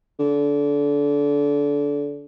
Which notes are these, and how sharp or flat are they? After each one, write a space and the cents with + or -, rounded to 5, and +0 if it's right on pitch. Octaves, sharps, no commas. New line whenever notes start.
D3 -25